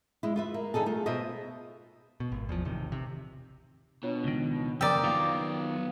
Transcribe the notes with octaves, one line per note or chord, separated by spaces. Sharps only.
G#3 E4
F4 B4 E5
A#3
D3 D#4 G#4 A4
A3 F4 G#4
B2 F4 C5 D#5 E5
B2
G#1
E2 F3
A1 C3 D#3
C3
B2 D4 F4 C#5
C#2 D#3
F2 C#3 A#3 D5 G5 A#5 D#6 E6
D#3 F#3 B3 F4 F5 D#6